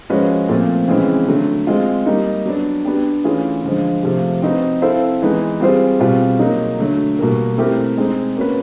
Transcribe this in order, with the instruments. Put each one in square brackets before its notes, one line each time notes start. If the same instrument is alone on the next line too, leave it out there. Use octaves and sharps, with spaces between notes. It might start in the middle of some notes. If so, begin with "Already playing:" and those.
[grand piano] F3 G#3 C#4 F#4 B4
A#2 F3 A3 C4
C#3 E3 G#3 C4
D3 F#3 A3
G#3 C4 F4
G3 A#3 D#4
F#3 B3 D4
B3 D4 G4
E3 A3 C#4 F4 G#4
D3 F3 G#3
C3 F3 A3
C4 D#4 F#4 B4
C4 E4 A4 C5 F5
E3 G#3 B3 D#4
G3 C4 F4 G#4 C5
B2 G3 C4 F4
F#3 A#3 D#4
D3 F#3 A3
B2 G3 A#3
A3 C4 E4 G4 A#4
G#3 C4 D#4
A#3 C#4 F#4 B4